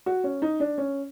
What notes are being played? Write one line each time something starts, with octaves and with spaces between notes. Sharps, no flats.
F#4
C#4
D#4
D4
C#4